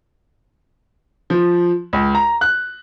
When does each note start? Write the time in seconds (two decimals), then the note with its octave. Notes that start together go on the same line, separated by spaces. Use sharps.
1.30 F3
1.93 C#2
2.15 A#5
2.41 F#6